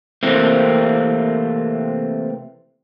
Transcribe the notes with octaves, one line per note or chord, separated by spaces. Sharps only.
C3 E3 A3 A#3 C4